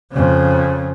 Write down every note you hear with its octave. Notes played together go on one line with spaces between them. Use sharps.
F2 C#3